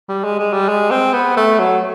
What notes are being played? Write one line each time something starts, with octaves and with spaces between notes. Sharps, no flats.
G3
G#3
G#3
G3
G#3
C4
B3
A3
F#3